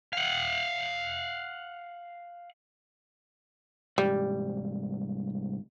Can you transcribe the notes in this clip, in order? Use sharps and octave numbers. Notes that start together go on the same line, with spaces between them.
F5 F#5
C2 G#2 G3